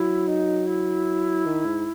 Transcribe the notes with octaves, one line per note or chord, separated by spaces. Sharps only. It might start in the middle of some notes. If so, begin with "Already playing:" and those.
Already playing: F#3 E4
D#4
E4
D#3
G#2